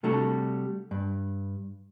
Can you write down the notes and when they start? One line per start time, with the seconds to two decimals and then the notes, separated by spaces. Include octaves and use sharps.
0.03 C3 G3 A3 D4 F#4 A4
0.91 G2